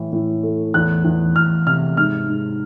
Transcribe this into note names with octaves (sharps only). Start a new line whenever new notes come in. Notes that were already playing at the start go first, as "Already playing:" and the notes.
Already playing: A2 E3
A2
A3
E2 F#6
E2
E2 F6
C3 F6
G#2 F6
G#2